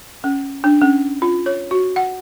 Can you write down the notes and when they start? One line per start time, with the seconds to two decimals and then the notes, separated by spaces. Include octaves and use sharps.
0.24 C#4
0.64 D4
0.81 C#4
1.22 F4
1.46 C#5
1.71 F#4
1.96 F#5